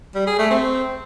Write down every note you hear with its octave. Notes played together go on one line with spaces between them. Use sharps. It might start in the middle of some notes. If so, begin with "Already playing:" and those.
G3
G#4
A3
C4